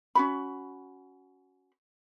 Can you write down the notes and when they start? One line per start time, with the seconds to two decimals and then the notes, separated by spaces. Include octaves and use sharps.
0.15 C#4 F#4 B5